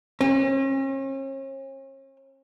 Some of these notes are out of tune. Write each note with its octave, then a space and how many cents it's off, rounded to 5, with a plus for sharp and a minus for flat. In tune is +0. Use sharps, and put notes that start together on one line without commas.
C#4 -40